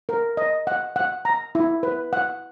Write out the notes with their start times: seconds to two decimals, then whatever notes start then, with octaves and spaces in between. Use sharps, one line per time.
0.09 A#4
0.37 D#5
0.67 F#5
0.96 F#5
1.25 A#5
1.55 E4
1.83 B4
2.13 F#5